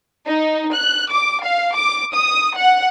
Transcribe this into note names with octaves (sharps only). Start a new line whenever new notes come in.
D#4
F#6
D6
F5
D6
D#6
F#5